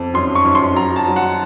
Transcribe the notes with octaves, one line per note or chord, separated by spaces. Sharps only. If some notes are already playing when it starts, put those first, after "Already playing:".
Already playing: F2
F#2 C6
C#6
F#2
C6
F#3 A#5
A5
F#3
F#5